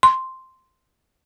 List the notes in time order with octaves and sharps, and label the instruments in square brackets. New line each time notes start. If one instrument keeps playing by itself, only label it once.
[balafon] C6